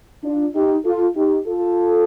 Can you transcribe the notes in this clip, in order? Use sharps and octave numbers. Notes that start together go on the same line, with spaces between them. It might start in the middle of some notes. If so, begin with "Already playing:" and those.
D4 F4
D#4 G4
F4 A4
D#4 G4
F4 A4